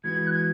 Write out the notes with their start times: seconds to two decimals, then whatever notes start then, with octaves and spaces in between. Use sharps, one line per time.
0.04 E3 G#3 B3 F#4 G#6
0.27 F#6
0.32 G#6